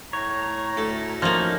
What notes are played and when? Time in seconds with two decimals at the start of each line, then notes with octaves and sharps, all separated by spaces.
0.13 A2 C#5 A#5
0.77 D2 A4
1.22 F3 A#3 C#4 D#4